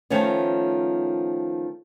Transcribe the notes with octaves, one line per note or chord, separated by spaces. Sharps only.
D#3 F3 A3 B3 C#4